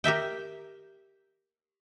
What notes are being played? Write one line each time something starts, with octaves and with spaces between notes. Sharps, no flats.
G4 A#4 E5 G5